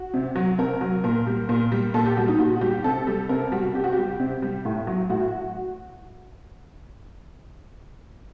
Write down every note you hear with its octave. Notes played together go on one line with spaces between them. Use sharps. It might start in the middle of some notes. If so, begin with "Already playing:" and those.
Already playing: F#4
C3
F#3
C3 A#4
F#3
A#2 A#4
G3
A#2 A#4
G3
A#2 A4
G4
G3 F#4
D#4
A#2 F#4
F#4
G3 G4
C3 A4
G3
C3 A#4
G3 F#4
C3 G4
F#4
G3 G4
C3
G3
A2
F#3
A2 F#4